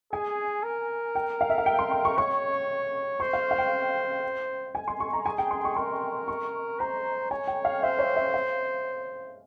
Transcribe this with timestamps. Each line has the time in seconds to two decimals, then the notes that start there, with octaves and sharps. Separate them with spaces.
0.12 G#4 G#5
0.63 A#4
1.15 G5
1.41 F5
1.50 E5
1.58 F5
1.66 G5
1.79 C6
1.92 C6
2.05 C#6
2.18 C#5 C#6
3.20 C5 C#6
3.33 F5
3.51 F5
3.58 G5
4.75 G#5
4.88 C6
5.00 C#6
5.13 A#5
5.26 G#4 G#5
5.38 G5
5.51 C6
5.65 C#6
5.76 A#4 C6
6.28 C#6
6.80 C5 A#5
7.31 C#5 G#5
7.47 G5
7.65 F5
7.83 C5 E5
7.99 C#5
8.16 E5
8.34 F5